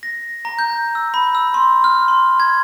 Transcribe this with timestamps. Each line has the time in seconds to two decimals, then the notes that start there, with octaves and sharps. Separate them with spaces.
0.03 A#6
0.45 A#5
0.59 G6
0.95 E6
1.14 B5
1.35 E6
1.54 C6
1.84 F6
2.08 C6
2.40 G#6